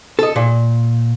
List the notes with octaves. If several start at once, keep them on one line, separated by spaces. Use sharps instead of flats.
A4 D#5
A#2